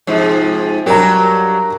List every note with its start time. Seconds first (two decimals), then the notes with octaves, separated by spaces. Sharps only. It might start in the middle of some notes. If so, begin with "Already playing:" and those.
0.07 G#2 C3 F3
0.86 G2 F#3 G4 A#4 A#5